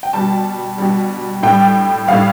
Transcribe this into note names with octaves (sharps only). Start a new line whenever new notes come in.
G5
B2 G3 A5
B2 G3
A2 G3 G5
A2 G3 F5